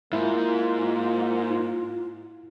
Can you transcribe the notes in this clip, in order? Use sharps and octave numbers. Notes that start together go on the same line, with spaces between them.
G#2 A#3 E4 F4